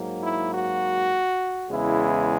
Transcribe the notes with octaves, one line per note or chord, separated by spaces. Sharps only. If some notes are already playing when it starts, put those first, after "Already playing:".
Already playing: G#2 F#3 A#3
E4
F#4
E2 C#3 G#3 E4